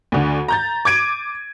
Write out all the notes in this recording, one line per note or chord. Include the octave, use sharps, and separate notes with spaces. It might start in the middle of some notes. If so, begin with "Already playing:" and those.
D2 D3
A#5 G6 A6
D6 G#6 D7 D#7